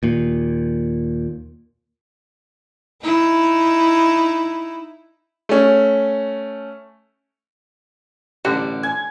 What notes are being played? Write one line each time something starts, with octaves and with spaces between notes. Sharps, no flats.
D#2 A#2
D#4 E4
A3 C#4
A1 D3 G3 F#4
G#5